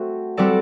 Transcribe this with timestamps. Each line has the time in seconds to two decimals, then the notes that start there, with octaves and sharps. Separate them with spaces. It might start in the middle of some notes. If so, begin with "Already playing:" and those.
Already playing: A3 C4 F#4
0.37 G3 C4 F#4 A4 D5